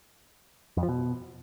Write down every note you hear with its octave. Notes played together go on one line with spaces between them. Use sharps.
F2
F3
B2